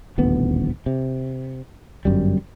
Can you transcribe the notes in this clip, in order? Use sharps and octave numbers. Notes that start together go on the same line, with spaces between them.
D#1 A1 D2 B3
C3
G1 F#2 G3